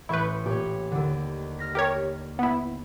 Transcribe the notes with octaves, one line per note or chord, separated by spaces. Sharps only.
A1 E4 B4 C#6 G6
A#2 G4 B4 C#5
D#2 D3
F6 A#6 B6
G4 A#4 C#5
B3 E4